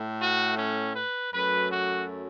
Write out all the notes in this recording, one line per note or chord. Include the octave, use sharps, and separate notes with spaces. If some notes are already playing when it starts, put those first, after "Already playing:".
Already playing: A2 A3
F#4
C#4
B4
F#2 F#3 A3 B4
F#4